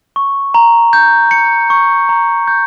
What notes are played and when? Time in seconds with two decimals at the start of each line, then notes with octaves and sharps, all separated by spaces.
0.16 C#6
0.54 A#5
0.93 G6
1.31 C#7
1.70 C#6
2.09 A#5
2.48 G6